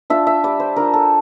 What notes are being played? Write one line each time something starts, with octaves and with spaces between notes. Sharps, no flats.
D4 F4 E5
E5
G3 D5
C5
D4 F4 A#4
A4